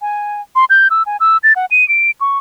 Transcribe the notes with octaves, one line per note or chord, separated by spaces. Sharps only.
G#5
C6
G6
E6
G#5
E6
A6
F#5
D#7
D7
C#6